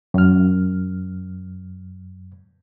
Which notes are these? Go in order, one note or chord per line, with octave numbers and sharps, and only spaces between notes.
F#2 F6